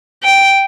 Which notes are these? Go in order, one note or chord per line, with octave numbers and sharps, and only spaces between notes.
G5